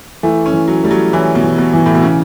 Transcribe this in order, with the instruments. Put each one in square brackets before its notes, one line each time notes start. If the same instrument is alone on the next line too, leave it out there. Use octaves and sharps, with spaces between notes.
[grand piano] E3 [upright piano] A3
[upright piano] C#4
[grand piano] E3
[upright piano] F#3
[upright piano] G3 [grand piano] A3
[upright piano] F#3
[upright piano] E3 [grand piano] C#4
[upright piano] B2
[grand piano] E3
[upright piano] B2
[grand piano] E3
[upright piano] A2
B2
C#3